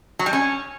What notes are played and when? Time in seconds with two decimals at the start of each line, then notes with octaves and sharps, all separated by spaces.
0.19 F#3
0.26 G3
0.33 C#4